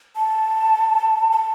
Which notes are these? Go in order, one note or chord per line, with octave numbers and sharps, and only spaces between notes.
A5
A5